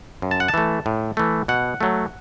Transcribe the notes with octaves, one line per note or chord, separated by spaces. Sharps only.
F#2
A5
F#5
A5
E3 A3
A2
E3 A3
B2 F#5
F#3 A3